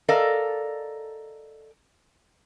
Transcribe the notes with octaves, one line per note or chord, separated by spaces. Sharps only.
A4 A#4 D5 D#5 F5